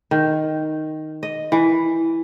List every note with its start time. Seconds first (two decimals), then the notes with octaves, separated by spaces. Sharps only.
0.11 D#3
1.23 D#5
1.52 E3